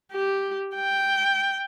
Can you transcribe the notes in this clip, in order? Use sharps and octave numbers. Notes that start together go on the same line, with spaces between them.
G4
G5